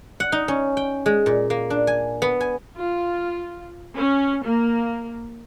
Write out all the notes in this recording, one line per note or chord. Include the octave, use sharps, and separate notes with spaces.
F#5
D#4
C#4
G5
G#3
A#2
A#3
D4
G#5
B3
G#5
F4
C#4
A#3